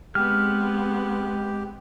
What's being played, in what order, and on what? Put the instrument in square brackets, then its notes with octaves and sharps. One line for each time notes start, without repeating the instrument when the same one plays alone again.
[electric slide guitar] G#3 [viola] B3 C4 [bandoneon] G4 [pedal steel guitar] F6